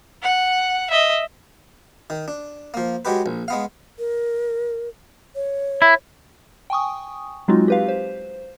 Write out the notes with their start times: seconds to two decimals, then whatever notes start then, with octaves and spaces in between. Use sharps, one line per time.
0.23 F#5
0.90 D#5 E5
2.10 D#3
2.28 D4
2.74 F3 A#3
3.05 F#3 G#3 G4 B4
3.26 A#1
3.48 G#3 B3 F5
3.99 A#4
5.35 C#5
5.82 E4
6.70 G5 G#5 C#6 D#6
7.48 F#3 G#3 C4 D#4 F4 F#4
7.68 G4 B4 F5
7.88 C5